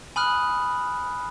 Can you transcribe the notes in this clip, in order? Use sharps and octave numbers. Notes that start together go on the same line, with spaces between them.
G#5 B5 D#6 F6 F#6